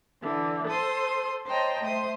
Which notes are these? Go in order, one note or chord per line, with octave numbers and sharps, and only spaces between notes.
D3 E3
A4 C5 C6 D#6
C5 C#5 D#5 G5 A5 A#5
A3 C5 D#6